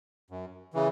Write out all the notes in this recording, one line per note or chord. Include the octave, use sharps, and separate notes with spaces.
F#2
C#3 E3